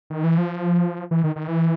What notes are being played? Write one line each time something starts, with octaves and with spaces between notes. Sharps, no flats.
D#3
E3
F3
E3
D#3
D#3
E3